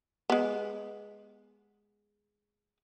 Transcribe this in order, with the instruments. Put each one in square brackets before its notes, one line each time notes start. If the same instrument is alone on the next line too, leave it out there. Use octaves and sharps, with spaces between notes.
[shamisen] G#3 B3